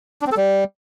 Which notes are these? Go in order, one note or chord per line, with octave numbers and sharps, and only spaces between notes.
D4
C4
A4
G3